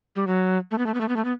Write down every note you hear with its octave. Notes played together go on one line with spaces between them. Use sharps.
G3
F#3
A3
B3
A3
B3
A3
B3
A3
B3